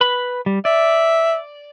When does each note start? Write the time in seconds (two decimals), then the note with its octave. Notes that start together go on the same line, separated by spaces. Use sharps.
0.01 B4 B5
0.46 G3
0.65 D5 E5